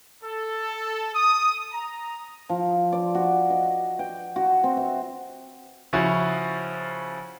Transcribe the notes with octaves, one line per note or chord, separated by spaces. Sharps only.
A4
D#6
A#5
F3
D5
F#4
D#5
G5
F#4
C4
E5
C#3 F3 C#4 E4 F#4